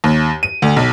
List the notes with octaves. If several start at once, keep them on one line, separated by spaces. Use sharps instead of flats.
D#2
D#7
D2
B1